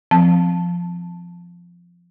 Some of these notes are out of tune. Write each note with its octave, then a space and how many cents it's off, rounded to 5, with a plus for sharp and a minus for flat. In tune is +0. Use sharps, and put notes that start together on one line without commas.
F3 +0 C4 +0 A5 +0